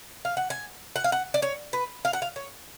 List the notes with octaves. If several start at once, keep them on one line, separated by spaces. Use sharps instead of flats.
F5
F#5
G#5
F#5
F5
F#5
D5
C#5
B4
F5
F#5
F5
C#5